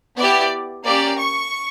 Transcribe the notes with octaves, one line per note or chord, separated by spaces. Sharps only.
B3 E4 G4 D5
A#3 C#4 G4 D5
C#6